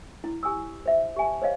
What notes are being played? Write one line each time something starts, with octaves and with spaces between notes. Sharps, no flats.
E4
G4 G#5 D#6 E6
C5 E5
G4 E5 G#5 A5
C5 C#5 D#5 F5